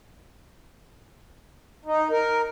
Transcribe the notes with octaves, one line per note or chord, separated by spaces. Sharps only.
D#4
A#4